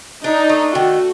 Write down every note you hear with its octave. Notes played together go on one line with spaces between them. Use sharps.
D4 D#4
A3
D#3 F#4